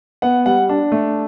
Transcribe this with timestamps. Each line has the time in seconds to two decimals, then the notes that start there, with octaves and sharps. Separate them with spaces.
0.22 B3 F#5
0.46 G3 F#5
0.69 D4
0.92 A3